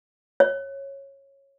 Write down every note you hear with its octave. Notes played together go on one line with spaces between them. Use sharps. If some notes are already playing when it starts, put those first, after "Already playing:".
C#5